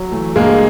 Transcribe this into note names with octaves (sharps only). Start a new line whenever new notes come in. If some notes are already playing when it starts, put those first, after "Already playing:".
Already playing: F#3
E3 A3
G2 G#3 A#3